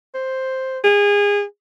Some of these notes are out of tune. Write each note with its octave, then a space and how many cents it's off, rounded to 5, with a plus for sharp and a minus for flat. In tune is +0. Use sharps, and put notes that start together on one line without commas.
C5 +5
G#4 -25